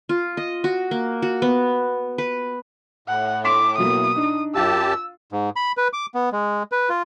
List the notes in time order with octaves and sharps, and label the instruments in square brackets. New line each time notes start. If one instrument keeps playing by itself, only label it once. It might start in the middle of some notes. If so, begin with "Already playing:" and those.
[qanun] F4
D#5
F#4
A#3
F#4
B3
B4
[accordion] A2 [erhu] F#5
[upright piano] C6 B6 E7 [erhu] D6
[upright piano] B2 F#3 A#3 [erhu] D#6
[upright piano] D4 D#4
[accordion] F#2 G4 A5 [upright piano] F4 [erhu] E6
[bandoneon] G#2
B5
B4
D6
B3
G#3
B4
F4